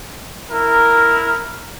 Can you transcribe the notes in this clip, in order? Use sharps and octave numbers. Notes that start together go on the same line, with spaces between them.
E4 A#4